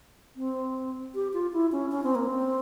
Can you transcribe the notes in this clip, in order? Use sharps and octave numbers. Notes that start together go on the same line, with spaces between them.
C4
G4
F4
E4
C#4
C#4
C4
A#3
C4